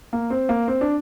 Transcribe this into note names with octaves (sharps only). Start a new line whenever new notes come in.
A#3
C4
A#3
C4
D4